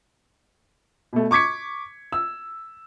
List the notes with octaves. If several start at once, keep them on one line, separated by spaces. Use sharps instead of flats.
B2 A3
C#6 D6 G#6 B6 C#7
E6